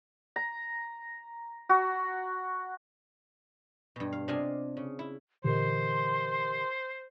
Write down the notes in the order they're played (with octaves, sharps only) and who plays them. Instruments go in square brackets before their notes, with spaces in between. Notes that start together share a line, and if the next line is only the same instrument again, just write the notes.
[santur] A#5
F#4
[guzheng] G2 B2
F5
C3 D4 F4 D#5 F5 G#5
C#3
E4
[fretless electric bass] A#2 D3 E3 [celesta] G4 A#4 D#5 [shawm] C5 [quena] C6